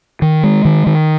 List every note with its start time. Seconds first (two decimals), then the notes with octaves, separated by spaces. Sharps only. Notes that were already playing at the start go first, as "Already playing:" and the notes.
0.22 D#3
0.44 G#3
0.65 D#3
0.87 D#3